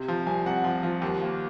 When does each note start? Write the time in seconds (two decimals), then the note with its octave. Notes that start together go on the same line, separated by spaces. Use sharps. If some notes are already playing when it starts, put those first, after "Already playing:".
Already playing: C3
0.08 F3
0.26 C2 G#5
0.46 C2 F#5
0.64 F3
0.83 F3
1.02 D#2
1.22 A#3